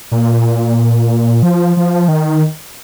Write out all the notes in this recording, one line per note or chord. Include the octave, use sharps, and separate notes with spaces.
A#2
F3
F3
D#3